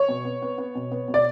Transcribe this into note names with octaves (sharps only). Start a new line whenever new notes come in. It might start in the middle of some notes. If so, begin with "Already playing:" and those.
Already playing: C#5
B2
B3
B3
B3
B2
B3
B2
D5